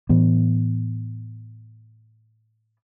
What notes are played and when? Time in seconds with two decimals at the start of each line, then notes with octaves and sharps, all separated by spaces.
0.09 A2 E3 B3